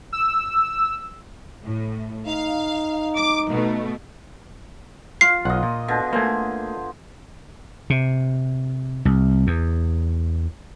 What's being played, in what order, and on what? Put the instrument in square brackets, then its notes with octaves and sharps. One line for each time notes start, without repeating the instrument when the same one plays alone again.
[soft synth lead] E6
[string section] A2
[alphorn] D#4 [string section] F5
[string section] D6
B2 A3
[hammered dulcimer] F4 [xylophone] C7
[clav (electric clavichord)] B1 F#5 [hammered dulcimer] F4 D#5
[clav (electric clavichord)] A#2
[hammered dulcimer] B2 D3
[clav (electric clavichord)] A3 A#3 [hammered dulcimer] C5 G#5
[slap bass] C3
C2
E2